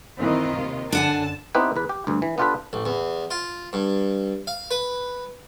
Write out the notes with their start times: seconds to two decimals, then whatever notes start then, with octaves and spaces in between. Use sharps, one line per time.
0.18 F#2 D#3 E3 C4 F4 D#5
0.53 D#2 C3
0.92 F#2 D3 D4 F#5 G#5 A5
1.55 B3 C4 D#4 E4 G4 B4
1.76 E2 B4
1.89 G4
2.07 D2 G2
2.22 E3
2.38 B3 D4 F4 G4 A4 B4
2.73 A1
2.86 E2
3.31 F4
3.73 G2
4.47 F5
4.71 B4